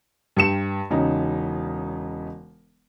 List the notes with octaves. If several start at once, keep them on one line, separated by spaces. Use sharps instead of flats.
G2 G4 C#7 E7
E1 C#3 D#4